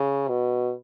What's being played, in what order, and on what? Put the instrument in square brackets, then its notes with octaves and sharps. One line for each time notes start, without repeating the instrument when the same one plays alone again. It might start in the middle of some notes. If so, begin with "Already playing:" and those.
Already playing: [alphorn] C#3
B2